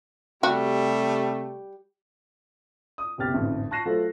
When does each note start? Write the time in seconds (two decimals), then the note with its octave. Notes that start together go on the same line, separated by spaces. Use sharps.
0.43 C3 G3 A3 F#4 G4
2.98 D#6
3.18 F#1 C2 B2 G4 F6 A6
3.34 A1 F2 G#2 D3
3.71 A5 C#6 F#6 A#6 C7 E7
3.86 F#3 A3 F4 A4 C5